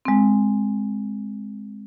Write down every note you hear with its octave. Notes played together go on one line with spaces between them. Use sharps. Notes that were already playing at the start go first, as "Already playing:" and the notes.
G#3 C4